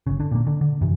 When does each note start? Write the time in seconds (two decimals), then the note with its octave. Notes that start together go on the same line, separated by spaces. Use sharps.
0.07 G1 C#3
0.20 D3
0.31 A#2 A#3
0.47 D3
0.61 D3
0.81 F#2 C3 E3